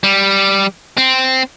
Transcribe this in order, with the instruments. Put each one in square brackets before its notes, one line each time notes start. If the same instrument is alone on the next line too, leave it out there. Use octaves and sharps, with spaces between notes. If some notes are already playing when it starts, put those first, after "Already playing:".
[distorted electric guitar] G3
C4